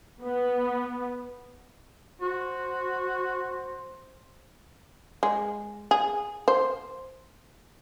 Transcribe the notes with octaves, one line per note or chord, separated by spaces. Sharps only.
B3
F#4 C5
G#3
G#4
C5